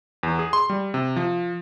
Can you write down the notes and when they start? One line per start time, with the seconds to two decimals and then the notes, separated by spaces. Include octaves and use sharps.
0.23 E2
0.39 G#4
0.53 C6
0.70 G3
0.94 C3
1.16 F3